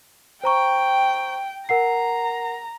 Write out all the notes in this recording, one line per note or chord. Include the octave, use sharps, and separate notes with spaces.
C5 G5 A#5 C#6
A#4 F#5 A#5 C7